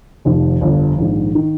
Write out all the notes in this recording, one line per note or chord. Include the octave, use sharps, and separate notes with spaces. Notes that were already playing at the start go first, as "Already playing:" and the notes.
F1 F2 D#3
G1 F2 D3 F3
A#1 G#2 D#3
D#3